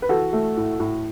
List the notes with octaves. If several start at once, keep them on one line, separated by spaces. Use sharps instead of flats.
B4
E3 F#4 A4
A3
A2
A2